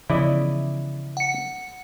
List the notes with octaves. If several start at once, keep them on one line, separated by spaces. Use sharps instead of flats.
C#3 E3 F3 B3 E4 D5 D#5
F#5 C#7